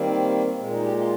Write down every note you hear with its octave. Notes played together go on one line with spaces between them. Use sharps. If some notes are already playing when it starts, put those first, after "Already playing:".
Already playing: D#3 G3 A#3 C4
A#2 G#3
D#4
G4
F4